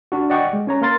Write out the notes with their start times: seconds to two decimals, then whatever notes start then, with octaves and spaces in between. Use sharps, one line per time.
0.12 D4 F#4
0.30 D5 D#5 F#5 G5 C#6 D6
0.53 G#3
0.67 C#4 C#5 A#5
0.82 A#3 A#4 C6 A6